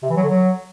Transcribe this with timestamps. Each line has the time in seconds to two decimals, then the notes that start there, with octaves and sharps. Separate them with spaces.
0.03 C3
0.10 E3
0.16 F#3
0.23 D3
0.30 F#3